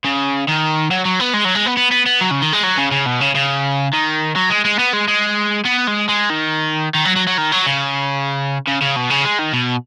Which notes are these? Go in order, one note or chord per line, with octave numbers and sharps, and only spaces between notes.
C#3
D#3
F#3
F#3
B3
G#3
F#3
G#3
B3
B3
B3
B3
F#3
C#3
D#3
G#3
F#3
C#3
C#3
B2
C#3
C#3
D#3
F#3
G#3
G#3
B3
G#3
G#3
B3
G#3
G#3
D#3
D#3
F#3
F#3
F#3
D#3
F#3
C#3
C#3
C#3
B2
C#3
G#3
D#3
B2